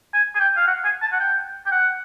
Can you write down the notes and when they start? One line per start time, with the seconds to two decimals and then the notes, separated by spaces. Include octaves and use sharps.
0.14 G#5
0.35 G#5
0.40 G5
0.57 F5
0.67 F#5
0.84 G#5
1.02 A5
1.12 F#5
1.20 G5
1.66 G5
1.71 F#5